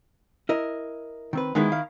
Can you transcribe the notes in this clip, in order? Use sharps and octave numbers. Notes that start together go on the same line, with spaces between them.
E4 A#4 D#5
D#3 C4 B4
D2 D#3 G#3 B3 E4
F5